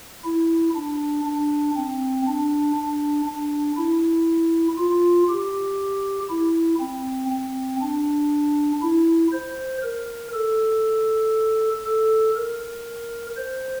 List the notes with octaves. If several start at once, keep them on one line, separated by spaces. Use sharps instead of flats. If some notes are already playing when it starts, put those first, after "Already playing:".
E4
D4
D4
C4
D4
D4
D4
E4
F4
G4
E4
C4
C4
D4
E4
C5
A#4
A4
A4
A#4
C5